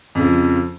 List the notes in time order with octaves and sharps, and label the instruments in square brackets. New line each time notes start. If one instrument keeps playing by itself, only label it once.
[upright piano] F2 C#3 F3